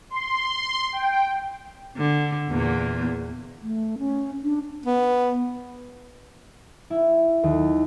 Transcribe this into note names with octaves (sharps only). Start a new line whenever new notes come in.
C6
G5
D3
E2 A#2 A#3
A3
C#4
D4
B3
E4
D#2